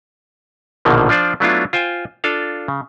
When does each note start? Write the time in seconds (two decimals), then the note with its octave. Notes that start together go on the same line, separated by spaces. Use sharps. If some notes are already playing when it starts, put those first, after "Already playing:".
0.85 A#1 B2 D3 D#3 F3 A#3
1.09 F3 D4 F4 C5 D5
1.40 F#3 A3 B3 D4 E4 F4
1.73 F4 C5 G5 G#5
2.24 D4 F4 A4 F5
2.68 C#3